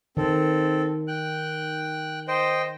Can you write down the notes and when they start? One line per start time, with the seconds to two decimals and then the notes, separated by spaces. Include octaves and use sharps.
0.17 D#3 C4 A4
1.08 G5 F#6
2.28 C5 D#5 G5